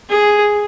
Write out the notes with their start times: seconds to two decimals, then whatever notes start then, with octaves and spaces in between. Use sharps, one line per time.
0.09 G#4